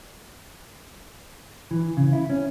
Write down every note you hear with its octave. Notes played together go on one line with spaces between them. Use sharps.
E3
C#3
E4
C#4